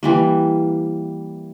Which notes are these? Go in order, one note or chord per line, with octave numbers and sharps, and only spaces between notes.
E3 G3 A#3